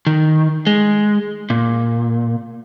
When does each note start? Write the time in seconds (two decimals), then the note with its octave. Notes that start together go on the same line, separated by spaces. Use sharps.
0.07 D#3
0.67 G#3
1.50 A#2